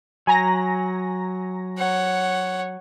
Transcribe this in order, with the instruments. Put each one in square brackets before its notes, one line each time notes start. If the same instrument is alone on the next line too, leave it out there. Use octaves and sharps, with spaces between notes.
[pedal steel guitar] F#3 [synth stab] G#5 A#5 A#6
[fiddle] C#5 F#5